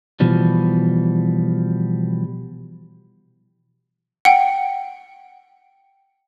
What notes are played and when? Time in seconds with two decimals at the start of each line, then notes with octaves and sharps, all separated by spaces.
0.20 B2 E3 F3 G3
4.25 F#5 G5